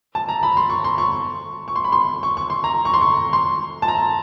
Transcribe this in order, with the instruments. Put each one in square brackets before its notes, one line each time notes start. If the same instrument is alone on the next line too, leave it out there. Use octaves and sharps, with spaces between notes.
[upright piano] A5
A#5
B5
C6
C#6
C6
C#6
C#6
C6
B5
C6
C#6
C#6
C6
A#5
C#6
C6
C#6
C6
A5
A#5